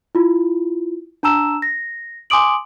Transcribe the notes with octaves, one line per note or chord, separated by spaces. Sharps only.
E4 F4
D4 A5 A#5 E6 E7
A#6
G#5 C6 D6 D#6 D7 F#7